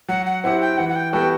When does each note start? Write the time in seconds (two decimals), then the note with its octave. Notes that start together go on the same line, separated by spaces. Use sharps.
0.09 F#3 F#5
0.26 F#5
0.44 C4 E4 G4 F#5
0.61 G5
0.78 E3 F#5
0.89 F#5
0.96 G5
1.13 G3 B3 F#4 A4 G5